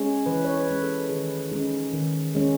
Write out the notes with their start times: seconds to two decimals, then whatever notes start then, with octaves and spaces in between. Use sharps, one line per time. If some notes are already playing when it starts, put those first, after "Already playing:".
Already playing: G#3 C#4
0.26 E3 B4
0.45 C#5
0.54 B4
0.68 G#3 C#4 G#4
0.82 A4
1.10 D#3 G#4
1.51 G#3 C#4 D#4
1.93 D#3
2.35 G#3 C#4